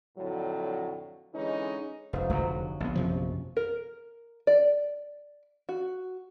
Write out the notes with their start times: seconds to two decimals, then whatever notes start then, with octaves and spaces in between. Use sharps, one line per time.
0.18 F2 A2 D3 F#3
1.34 D3 E3 G#3 C#4 D#4
2.13 F1 G#2 C#3
2.30 F1 F2 B2 D3 F#3
2.80 A#1 B3
2.96 F#2 C3 F3
3.57 A#4
4.47 D5
5.69 F#4